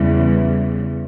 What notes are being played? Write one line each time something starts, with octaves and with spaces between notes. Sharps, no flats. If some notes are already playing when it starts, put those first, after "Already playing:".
Already playing: E2 C#3 E3 G3